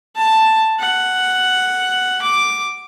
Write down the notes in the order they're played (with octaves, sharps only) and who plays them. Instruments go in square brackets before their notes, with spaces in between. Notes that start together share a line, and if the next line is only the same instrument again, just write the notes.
[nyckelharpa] A5
F#5
D6